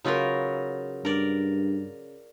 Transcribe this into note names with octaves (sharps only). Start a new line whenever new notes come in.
C#3 F#3 D#4 F4 A#4 B4
G2 A#4 D5